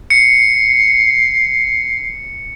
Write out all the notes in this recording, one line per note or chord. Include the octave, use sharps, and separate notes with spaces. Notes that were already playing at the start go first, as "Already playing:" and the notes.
C7 C#7